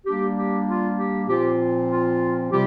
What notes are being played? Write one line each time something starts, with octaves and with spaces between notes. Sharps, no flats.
G3 A#3 D4 G4
G4
F4
G4
A#2 F3 C4 F4 G4
F4
C3 G3 C4 F4 G4